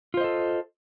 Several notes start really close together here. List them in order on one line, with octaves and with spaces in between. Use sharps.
F4 C5 D#5 A4